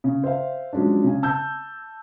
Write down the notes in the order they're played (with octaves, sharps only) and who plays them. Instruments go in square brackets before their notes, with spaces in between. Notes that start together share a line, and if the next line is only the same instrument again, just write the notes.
[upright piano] C#3
C5 E5 F5
F3 F#3 G#3 C#4 D4
C#3 G#5
A5 E6 G6